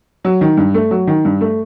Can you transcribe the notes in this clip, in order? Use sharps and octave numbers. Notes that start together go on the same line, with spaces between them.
F#3
D#3
G2
A3
F#3
D#3
G2
A3